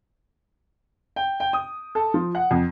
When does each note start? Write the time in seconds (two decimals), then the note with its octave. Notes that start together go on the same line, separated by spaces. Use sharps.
1.16 G5
1.40 G5
1.53 D#6
1.95 A4
2.14 F3
2.35 F#5
2.51 F2